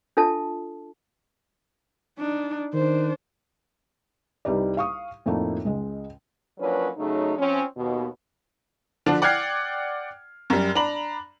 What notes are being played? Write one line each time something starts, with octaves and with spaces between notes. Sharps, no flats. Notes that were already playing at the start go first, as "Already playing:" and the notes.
D4 F4 A4 E5 A5
D4 D#4
D#3 D4 C5
C2 G3 D#4 B4 D5
F5 C#6 D#6
F2 A2 F3 A3 A#3 D#4
C#2 G#3 D#5
F3 F#3 A#3 C#4 D4 B4
F#2 C#3 F#3 A3 D#4
F3 C4 C#4
D#2 B2
D3 F3 D4
D5 F#5 G5 F6 G#6 C7
F#2 G3
D4 A#5 B5 F#7